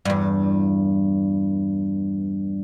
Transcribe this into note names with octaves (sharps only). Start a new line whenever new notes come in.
E2 G2